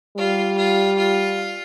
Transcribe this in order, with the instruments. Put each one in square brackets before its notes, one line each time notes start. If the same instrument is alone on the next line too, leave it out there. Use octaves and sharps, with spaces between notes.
[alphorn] G3 [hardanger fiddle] F4
[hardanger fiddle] F4
F4